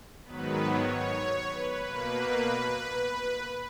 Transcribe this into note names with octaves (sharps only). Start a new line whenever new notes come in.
G#2 D#3 F#3 B3 B4
C#5
B4
B2 A#3 B4